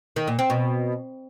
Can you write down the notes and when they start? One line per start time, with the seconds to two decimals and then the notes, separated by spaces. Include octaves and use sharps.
0.16 D#3
0.28 A#2
0.39 C4
0.50 B2